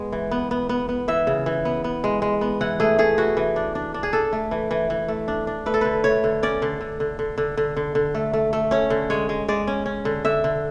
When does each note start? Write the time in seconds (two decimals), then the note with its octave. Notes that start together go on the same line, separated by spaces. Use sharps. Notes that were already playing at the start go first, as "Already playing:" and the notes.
Already playing: G#3 B3
0.13 E3
0.31 B3
0.51 B3
0.69 B3
0.89 B3
1.08 E3 E5
1.27 C#3
1.46 E3
1.65 B3
1.84 B3
2.04 G#3
2.22 G#3
2.41 B3
2.61 E3 F#5
2.80 A3 G#4
2.99 A3 G#4
3.18 E3 F#4
3.37 E3
3.56 D4
3.75 D4
3.94 D4
4.03 G#4
4.13 D4 A4
4.33 A3
4.51 E3
4.71 E3
4.90 E3
5.08 A3
5.28 D4
5.47 D4
5.66 A3 B4
5.74 A4
5.81 D3 B4
6.04 A3 C#5
6.24 D3
6.43 C#4 D5
6.62 D3
6.81 D3
7.00 D3
7.19 D3
7.38 D3
7.57 D3
7.77 D3
7.95 D3
8.15 A3
8.33 A3
8.53 A3
8.71 C#4 C#5
8.90 D3
9.10 G#3 C#5
9.29 G#3
9.48 G#3 D5
9.67 C#4
9.86 C#4
10.05 D3
10.25 D3 E5
10.44 D3